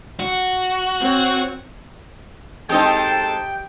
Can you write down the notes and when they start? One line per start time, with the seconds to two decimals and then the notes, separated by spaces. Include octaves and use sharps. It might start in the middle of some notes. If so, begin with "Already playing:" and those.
0.20 F#4
1.00 C4 C#5
2.69 G#3 C4 D#4 G4 A4 D#5 G5 A5